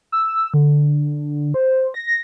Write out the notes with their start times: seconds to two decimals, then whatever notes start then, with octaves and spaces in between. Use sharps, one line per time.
0.12 E6
0.54 D3
1.54 C5
1.94 A#6